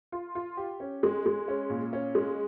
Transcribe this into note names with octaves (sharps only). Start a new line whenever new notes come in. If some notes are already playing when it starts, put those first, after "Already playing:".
F4
F4
G4
C#4
G#3
G#3
C#4
A#2
C#4
G#3